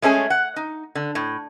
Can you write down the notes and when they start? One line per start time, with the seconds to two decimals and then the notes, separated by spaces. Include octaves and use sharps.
0.02 G#3 A3 C#4 G#4
0.30 F#5
0.56 D#4
0.95 D3
1.15 A2